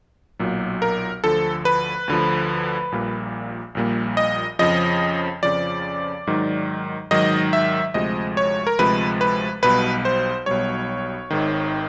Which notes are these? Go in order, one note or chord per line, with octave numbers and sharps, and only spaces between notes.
B1 A#2 F#3
A#4
D2 D3 F3 A4
B4
D2 D3 F3
A#1 A#2 G3 A#3
A#1 A#2 G3 A#3
D#5
F2 C#3 F3 D#5
F2 C#3 F3 D5
G#2 D#3 F#3
G#2 D#3 F#3 D#5
E5
D2 C3 F3 G#3 D#5
C#5
A#4
D2 C3 F3 G#3 B4
B4
B1 B2 G3 B4
C5
B1 B2 G3 C#5
G#1 G#2 D#3